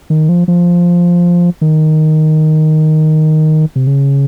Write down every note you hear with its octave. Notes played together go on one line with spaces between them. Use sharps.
D#3
F3
F3
D#3
C3
C#3